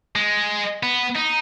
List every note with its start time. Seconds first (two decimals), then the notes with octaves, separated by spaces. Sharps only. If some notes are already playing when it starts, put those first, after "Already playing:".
0.15 G#3
0.83 B3
1.16 D#4